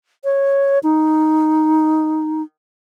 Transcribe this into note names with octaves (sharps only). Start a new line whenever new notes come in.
C#5
D#4